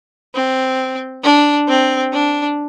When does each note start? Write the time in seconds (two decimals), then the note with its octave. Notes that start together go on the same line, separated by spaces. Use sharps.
0.35 C4
1.23 D4
1.68 C4
2.13 D4